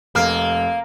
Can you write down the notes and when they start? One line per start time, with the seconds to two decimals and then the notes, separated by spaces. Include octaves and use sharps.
0.15 F1 A#3 F6 C7